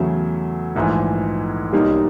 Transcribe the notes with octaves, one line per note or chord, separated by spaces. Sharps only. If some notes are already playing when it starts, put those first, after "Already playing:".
Already playing: E2 C#3 F#3 A3
A#1 G#2 E3 A3
B1 B2 G3 A#3 D#4